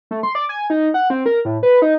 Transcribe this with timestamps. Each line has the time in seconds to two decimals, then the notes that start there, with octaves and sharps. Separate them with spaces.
0.11 A3
0.23 C6
0.35 D5
0.49 G#5
0.70 D#4
0.94 F#5
1.10 C4
1.26 A#4
1.45 A2
1.63 B4
1.82 D#4